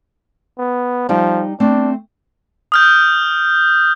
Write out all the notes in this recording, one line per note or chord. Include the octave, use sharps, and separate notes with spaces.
B3
F3 G3 D#4 G5
A3 C4 D4
D#6 F6 G6